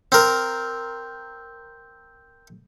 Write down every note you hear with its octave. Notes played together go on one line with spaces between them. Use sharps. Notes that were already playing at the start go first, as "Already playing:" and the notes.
C4 A#4